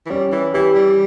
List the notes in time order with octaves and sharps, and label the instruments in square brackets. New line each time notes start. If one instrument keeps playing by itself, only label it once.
[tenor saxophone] E3
[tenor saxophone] G3 [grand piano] C#4
[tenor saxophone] E3
[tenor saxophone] E3 [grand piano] G4
[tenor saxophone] G3